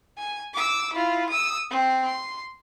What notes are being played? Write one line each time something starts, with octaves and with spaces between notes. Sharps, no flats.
G#5
D6 E6
E4 F4
D#6 E6
C4
C6